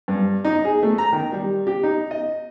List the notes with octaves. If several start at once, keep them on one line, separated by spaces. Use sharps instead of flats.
G2
D#4
G#4
A3
A#5
D#3
G3
G4
D#4
D#5